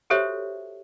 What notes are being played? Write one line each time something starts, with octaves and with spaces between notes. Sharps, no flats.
F#4 G4 A4 C5 C#5 E5